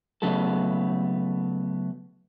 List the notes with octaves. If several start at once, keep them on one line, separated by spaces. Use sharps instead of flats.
C#3 F#3 A3 B3 A4